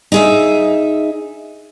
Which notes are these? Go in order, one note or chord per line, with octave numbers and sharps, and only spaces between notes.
D#4 G#4 E5